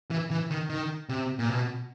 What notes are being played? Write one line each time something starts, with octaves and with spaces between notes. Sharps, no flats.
E3
E3
D#3
D#3
C3
A#2
B2